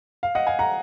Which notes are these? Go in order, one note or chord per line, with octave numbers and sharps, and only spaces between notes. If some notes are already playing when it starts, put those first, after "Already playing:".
F5
D#5 F#5
F5 G#5
F#5 A#5